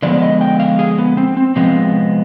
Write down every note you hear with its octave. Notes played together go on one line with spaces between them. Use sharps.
D3 F3 G#3 B3 D5
D#5
G5
F5
G#4
B3
C4
C4
C3 F3 G#3 B3 C4